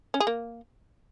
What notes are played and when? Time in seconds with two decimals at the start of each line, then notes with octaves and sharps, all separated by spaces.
0.14 C#4
0.20 G#4
0.27 A#3